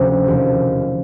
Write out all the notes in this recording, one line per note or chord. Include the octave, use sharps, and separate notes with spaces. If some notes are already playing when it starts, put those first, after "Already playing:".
Already playing: D2 C3 F3 C#4
E1 D#2 D3 F3